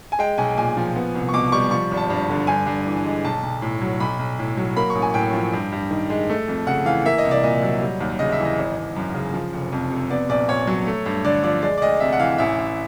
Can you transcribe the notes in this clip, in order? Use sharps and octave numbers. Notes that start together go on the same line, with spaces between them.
G#5
G#3 G5
B1 G#5
A#2 G#5
F3
B3
C2
C#6
B2 D6
D6
G3 C#6
F3 C#6
G#1
A5
G2
D3
G2 G#5
G2
E3
G#3
B1 A5
B1
A2
F#3
B1 B5
B1
A2
F#3
A#3 B5
C#6
A1
G#5
A2 G5
F3
G2
G2
D#3
G#3
A3
F2
C#3 F#5
E3 F5
A#3 E5
D#5
C2
D5
A#2 D#5
F#3
G3
D#2
C#3 D#5
E5
E3
D#5
G#1
G#1
F#2
C#3
F3
F1
F2
C3
B3 D5
A#1 D5
A#2 C#5
F#3
A3
G2
D3 D5
F3 D5
G#3 D5
D5
D2 D#5
C3 E5
F#5
E3 F5
A1 E5
A1